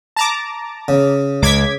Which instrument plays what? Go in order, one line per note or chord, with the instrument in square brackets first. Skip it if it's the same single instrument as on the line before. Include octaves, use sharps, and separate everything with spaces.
[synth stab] A5 A#5 D6
[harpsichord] C#3
[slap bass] C#2 [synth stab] D6 G#6 B6